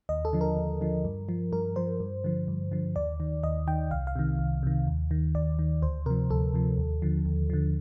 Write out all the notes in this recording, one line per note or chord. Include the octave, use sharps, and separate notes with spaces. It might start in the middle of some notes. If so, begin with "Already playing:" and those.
D#2 D#5
A4
D3 F3
A#4
D#2
D3 F3
G2
F3
G2 A#4
F3 C5
G2
D3 F3
G2
D3 F3
D#2 D5
D#3
D#2 D#5
D#3 G5
C2 F5
F5
C3 D#3
C2
C3 D#3
D#2
D#3
D#2 D5
D#3
D2 C5
C3 F3 A#4
D2 A4
C3 F3
D#2
D3 F3
D#2
D3 F3